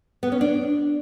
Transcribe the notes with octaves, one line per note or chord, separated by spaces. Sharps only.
B3
C#4
D4